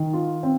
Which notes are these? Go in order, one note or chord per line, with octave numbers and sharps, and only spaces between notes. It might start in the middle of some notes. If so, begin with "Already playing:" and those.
Already playing: D#3
F4
C4